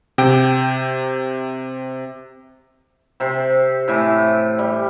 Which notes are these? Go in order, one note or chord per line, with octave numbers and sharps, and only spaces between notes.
C3 G5 G6
C3 C4
A2 E3
G3